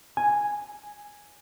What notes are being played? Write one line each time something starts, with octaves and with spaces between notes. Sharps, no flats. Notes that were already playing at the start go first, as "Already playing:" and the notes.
G#5